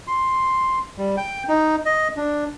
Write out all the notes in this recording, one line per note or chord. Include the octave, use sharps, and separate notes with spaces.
C6
G3
G5
D#4
D#5
D4